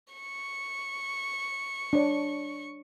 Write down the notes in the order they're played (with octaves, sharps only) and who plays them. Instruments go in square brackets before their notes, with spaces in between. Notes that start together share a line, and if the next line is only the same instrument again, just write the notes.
[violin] C#6
[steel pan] D4 C#5